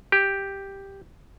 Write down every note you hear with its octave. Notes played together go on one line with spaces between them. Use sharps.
G4